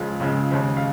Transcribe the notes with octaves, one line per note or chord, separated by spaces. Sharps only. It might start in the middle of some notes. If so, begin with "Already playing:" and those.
Already playing: C#2 C#3 F3 G#3
C#2 C#3 F3 G#3
D#2 C#3 G#3 C4
F5